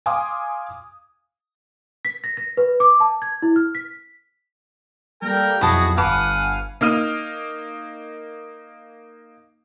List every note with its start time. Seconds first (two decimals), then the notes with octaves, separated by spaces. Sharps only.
0.06 F5 G#5 C6 D6 D#6
2.05 B6
2.24 A#6
2.37 A#6
2.57 B4
2.80 D6
3.00 A5
3.22 G#6
3.42 E4
3.56 F6
3.75 B6
5.22 G3 A#3 A4 A#4 G5
5.61 B1 F2 E4 F#4 G#4 D#5 A5
5.97 G1 B4 F5 F#5 G#5 A5 D6 D#7
6.81 A#3 D#4 F6 D#7